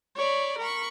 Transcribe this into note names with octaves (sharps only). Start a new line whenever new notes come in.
C#5 D5 B5
A#4 B5 C#6